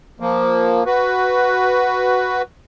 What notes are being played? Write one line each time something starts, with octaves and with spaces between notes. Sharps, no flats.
F3 A#3
F#4 B4